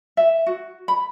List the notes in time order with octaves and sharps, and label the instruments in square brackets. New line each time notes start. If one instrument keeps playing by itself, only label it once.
[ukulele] E5
F#4
B5